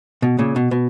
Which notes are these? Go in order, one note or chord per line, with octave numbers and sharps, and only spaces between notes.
B2
A#2 C#3
B2
B2